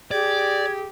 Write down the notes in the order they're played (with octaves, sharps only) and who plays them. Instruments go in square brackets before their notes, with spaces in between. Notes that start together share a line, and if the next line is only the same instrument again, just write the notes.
[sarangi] G4 [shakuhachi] G#4 [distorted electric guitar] D5 [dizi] G#6